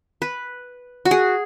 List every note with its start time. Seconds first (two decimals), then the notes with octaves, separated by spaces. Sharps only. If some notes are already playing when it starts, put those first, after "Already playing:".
0.22 B4
1.05 F#4
1.11 G#4